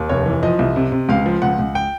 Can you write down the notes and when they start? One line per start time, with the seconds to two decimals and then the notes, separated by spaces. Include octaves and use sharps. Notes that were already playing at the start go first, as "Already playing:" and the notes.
Already playing: D#2
0.09 F1 C#5
0.26 E3
0.43 F3 D#5
0.59 C2
0.76 C3
0.92 C3
1.09 C#2 F5
1.26 F3
1.42 C#2 F#5
1.59 C#2
1.75 G5